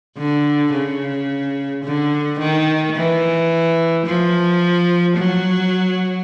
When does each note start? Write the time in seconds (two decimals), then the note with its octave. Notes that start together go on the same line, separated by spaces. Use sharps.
0.18 D3
0.73 C#3
1.85 D3
2.39 D#3
2.96 E3
4.06 F3
5.17 F#3